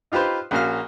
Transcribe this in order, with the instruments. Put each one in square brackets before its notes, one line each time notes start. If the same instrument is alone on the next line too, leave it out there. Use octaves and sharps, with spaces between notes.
[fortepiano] D#4 F4 G4 B4 C5
A#1 A#3 C#4 F#4 F5 F6